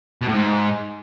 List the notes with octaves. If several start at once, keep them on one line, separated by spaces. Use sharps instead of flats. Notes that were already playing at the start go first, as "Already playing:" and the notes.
B2
A2
G#2